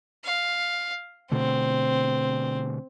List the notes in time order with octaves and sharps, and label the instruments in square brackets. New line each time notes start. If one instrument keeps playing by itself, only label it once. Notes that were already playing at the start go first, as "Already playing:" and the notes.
[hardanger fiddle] F5
[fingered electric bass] B2 D3 A3 [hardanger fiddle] C4